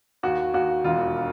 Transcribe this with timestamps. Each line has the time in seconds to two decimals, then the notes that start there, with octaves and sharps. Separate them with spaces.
0.23 D#2 F#4
0.54 D#2 F#4
0.84 E1 F4